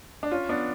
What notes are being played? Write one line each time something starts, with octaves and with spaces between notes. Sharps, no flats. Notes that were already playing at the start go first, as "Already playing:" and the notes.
D4
C#4 F4
B3 D4